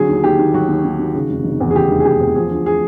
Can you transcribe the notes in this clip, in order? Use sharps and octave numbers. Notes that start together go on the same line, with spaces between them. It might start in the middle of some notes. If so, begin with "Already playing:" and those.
Already playing: D3 F#3 G#4
D#2
D#2 G4
D#3
F#3 F#4
D#2
D#2
D#3
C#3
F1
F1
E2
G#4
C#3 G4
F1
G#4
F1 G4
E2
F3 G#4
D2
G#4